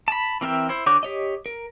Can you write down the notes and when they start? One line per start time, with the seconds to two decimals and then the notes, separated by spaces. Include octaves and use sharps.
0.08 A5 B5
0.41 E3 C4 A#4 E5 G5
0.69 E4 C5
0.86 D3 F#4 C#5 D6 G6
1.03 G4 C#5 D#5
1.46 A#4